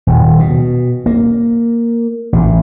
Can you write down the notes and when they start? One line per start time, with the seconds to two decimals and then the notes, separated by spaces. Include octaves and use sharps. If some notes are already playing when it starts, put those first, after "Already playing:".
0.07 D#1
0.39 B2
1.06 A#3
2.33 A1